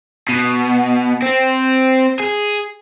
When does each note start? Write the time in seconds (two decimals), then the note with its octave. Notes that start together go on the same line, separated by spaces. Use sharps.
0.29 B2
1.22 C4
2.20 G#4